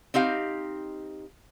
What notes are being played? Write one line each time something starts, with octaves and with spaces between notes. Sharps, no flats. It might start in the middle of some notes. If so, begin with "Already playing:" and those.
C4 D#4 G4 F5